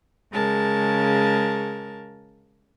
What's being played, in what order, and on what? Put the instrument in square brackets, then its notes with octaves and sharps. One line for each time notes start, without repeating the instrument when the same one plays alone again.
[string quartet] C#3 G#3 A#4 A5